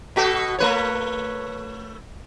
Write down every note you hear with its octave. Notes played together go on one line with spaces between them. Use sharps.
B2 F#4 A4
A3 B4 C#5